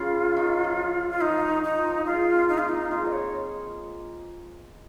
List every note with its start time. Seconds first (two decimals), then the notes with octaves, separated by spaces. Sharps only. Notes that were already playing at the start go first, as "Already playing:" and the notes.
Already playing: C#3 F4
0.37 D#3
0.64 F3
1.09 F4
1.21 F3 D#4
1.50 D#3
1.64 D#4
1.78 F3
2.06 G#3 F4
2.34 C4
2.49 D#4
2.58 F4
2.63 A#3
2.69 D#4
2.91 G#3 F4
3.06 D#5
3.12 C#5